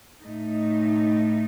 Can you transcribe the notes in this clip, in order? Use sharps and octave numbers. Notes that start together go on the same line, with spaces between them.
A2 A3 D#4